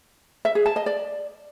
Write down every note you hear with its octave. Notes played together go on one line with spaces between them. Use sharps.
E5
G#4
A5
D#5
D5